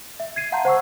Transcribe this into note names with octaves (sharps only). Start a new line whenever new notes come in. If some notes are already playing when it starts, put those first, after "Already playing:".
E5
G#6 C7 D#7
F5 F#5 A5 A#5 C6 G6
C5 F#5 C#6 E6